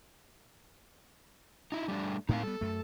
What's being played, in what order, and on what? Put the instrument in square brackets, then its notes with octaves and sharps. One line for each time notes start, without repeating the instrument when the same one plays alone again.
[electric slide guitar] D#4 E4
G3 A3 D4
[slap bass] A2 A3 C4 [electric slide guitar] D#4 A#4 F5
[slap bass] G3 B3 [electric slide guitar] A4
[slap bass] F#2 A3